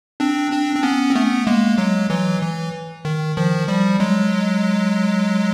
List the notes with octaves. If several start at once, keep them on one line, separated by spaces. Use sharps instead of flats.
C4 D4
C4 D4
C4
B3 C#4
C4
A3 B3
G#3 A#3
F#3 G#3
E3 F#3
E3
D#3
D#3 F3
F3 G3
F#3 G#3